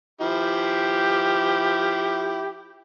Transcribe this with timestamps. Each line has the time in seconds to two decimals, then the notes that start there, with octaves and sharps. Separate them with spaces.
0.21 F3 E4 G4